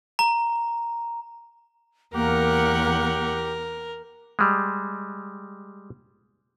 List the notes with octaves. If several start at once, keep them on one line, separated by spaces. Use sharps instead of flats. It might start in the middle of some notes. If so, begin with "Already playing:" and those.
A#5
E2 A#3 G4 A#4 F#5
G3 G#3